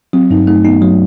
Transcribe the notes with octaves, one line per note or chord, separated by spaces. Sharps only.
F#3 C4
G2 D#4
A3 D#4
B3 D#4
F#3